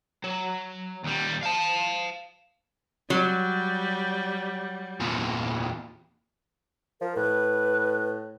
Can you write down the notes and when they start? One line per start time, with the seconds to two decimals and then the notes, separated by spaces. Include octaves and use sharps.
0.24 F#3
1.04 D#2 G3
1.43 F5 A5
3.10 F#3 G3
5.00 E2 A#2
7.01 F3 A#4
7.16 A2 B4